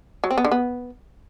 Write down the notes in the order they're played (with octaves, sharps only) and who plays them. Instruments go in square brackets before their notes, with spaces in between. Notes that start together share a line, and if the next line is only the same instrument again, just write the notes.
[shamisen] F#3
C4
B3
D3
B3